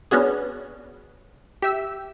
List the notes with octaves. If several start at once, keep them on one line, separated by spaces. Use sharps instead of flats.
B3 C#4 D4 F#4 G#4
G4 E5 E6